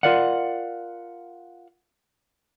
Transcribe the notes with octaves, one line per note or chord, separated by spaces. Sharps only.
F4 A#4 D5 F5 F#5